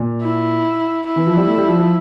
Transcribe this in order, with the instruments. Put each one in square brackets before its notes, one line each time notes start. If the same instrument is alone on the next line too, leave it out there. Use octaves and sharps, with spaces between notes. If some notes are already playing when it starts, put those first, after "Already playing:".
Already playing: [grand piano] A#2
[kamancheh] E4
E4
[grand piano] E3
F3
G3
A3
G3
F3
F3